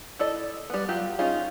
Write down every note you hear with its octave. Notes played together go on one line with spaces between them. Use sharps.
E4 A4 D5 D#5
G3 B3
F#3 F4 G4
C#4 D#4 F4 G#4